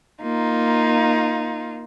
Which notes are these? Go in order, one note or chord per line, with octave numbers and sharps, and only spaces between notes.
A#3 D#4 F4